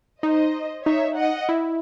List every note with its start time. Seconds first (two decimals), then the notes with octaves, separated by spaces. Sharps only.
0.23 D#4 C5 D#5
0.86 D#4 C#5 E5
1.17 D#5 F#5
1.49 E4